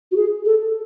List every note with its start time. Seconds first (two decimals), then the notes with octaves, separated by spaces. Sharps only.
0.11 F#4
0.16 G#4
0.46 A4